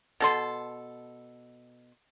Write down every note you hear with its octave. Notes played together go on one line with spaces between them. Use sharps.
B2 A4 C6